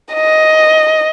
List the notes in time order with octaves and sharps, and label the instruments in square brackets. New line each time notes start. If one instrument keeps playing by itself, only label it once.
[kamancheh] D#5